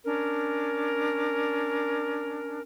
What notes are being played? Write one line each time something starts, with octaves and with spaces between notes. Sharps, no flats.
C#4 D4 A#4